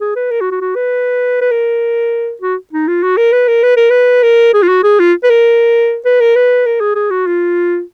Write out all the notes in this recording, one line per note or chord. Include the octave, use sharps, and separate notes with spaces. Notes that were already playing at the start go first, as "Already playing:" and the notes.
G#4
B4
A#4
F#4
F#4
F#4
B4
B4
A#4
F#4
D#4
F4
F#4
A#4
B4
A#4
B4
A#4
B4
A#4
G#4
F4
F#4
G#4
F4
B4
A#4
B4
A#4
B4
A#4
G#4
G#4
F#4
F4